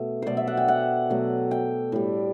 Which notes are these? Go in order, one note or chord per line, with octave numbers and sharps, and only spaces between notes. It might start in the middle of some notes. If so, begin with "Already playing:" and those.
Already playing: B2 A3
B2 F#3 A3 C5 D5
E5
F#5
G5
F#5
B2 F#3 A3
G5
A2 G3